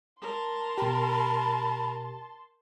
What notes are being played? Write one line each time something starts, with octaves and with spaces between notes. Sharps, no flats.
A#4 A5 C6
B2 G4 B5